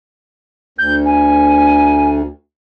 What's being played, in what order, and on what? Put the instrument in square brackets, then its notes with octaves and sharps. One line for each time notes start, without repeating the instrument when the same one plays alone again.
[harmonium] D2 [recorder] G6
[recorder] G#5